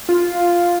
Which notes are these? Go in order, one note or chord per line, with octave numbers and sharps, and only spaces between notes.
F4